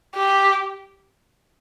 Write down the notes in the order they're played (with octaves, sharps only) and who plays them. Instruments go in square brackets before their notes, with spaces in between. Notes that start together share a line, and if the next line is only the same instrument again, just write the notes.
[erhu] G4